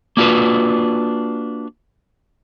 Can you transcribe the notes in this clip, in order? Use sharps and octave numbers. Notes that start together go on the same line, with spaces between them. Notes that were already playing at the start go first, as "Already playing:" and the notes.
A#3 D4 F4 F#4 B4